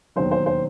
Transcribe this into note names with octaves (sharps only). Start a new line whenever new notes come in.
E1 D#2 D#3 F#3 C5
C5
C5